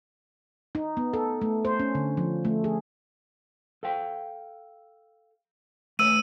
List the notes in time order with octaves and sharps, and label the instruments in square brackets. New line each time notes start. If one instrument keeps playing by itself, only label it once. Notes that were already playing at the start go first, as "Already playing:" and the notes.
[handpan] D#4
B3
A4
A3
C5
C#4
D3
F3
A3
G#4
[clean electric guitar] A4 F5 G5
[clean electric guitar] A3 B4 C#5 [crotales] E6 D#7